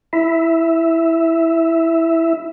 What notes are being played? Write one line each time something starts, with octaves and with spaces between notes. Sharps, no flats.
E4 E5